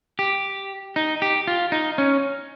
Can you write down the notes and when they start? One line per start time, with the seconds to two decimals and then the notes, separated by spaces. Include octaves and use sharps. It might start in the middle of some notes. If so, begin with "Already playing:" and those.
0.19 G4
0.96 D#4
1.22 G4
1.47 F4
1.72 D#4
1.98 C#4